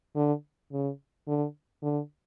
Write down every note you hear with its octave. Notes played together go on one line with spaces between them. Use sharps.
D3
C#3
D3
D3